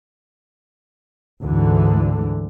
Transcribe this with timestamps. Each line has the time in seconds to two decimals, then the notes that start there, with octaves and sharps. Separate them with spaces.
1.44 D2 G#2 D3 E3